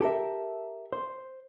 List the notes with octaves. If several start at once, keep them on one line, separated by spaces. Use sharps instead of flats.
G4 A4 A#4 E5
C5